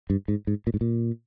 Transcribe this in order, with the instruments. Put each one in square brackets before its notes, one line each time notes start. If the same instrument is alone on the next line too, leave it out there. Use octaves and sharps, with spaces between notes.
[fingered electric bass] G2
G#2
G#2
A#2
G#2
A#2